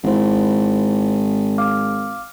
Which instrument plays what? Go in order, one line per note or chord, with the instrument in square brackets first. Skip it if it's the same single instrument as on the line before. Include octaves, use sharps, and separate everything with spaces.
[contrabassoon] G#1 [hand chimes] E4 C5
[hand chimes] F5 D6 F6